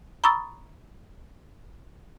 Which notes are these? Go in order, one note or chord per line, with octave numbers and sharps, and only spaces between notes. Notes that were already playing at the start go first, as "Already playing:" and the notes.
A#5 B5 C#6 D#6 E6 A6